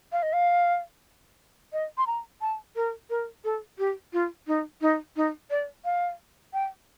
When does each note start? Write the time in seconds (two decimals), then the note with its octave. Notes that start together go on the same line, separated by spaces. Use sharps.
0.12 F5
0.23 D#5
0.33 F5
1.73 D#5
1.98 C6
2.07 A#5
2.41 A5
2.76 A#4
3.10 A#4
3.44 A4
3.78 G4
4.13 F4
4.47 D#4
4.81 D#4
5.16 D#4
5.50 D5
5.85 F5
6.53 G5